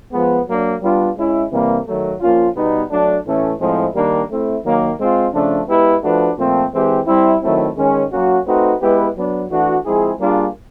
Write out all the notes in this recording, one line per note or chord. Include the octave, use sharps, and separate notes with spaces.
F3 G#3 B3
F#3 A#3 D4
G3 B3 D4 F4
G#3 C#4 E4
C3 E3 G3 A#3
D#3 F#3 A3
F3 A#3 C#4 F4
B2 G3 B3 D#4
F#3 A3 D4
A2 E3 A3 C#4
A2 F3 G#3 C4 E4
D#3 G3 A#3 D4
A3 C4 E4
D#3 F#3 A#3
G#3 C4 F4
C#3 F3 A3 D4
G#3 B3 E4 G4 B4
F3 A3 D4 F#4 B4
A#2 F3 A3 C4
E3 G#3 C4 E4 G4
G3 C4 E4
D#3 F#3 A3 C4 E4
D#3 G#3 C#4
F#3 A#3 C#4 F#4
A3 C4 D#4 F#4 B4
G#3 B3 E4 G4 B4
F#3 B3 D4
E3 A3 D4 F#4
F3 G#3 C4 E4 G#4
G3 A#3 D4 F4 G#4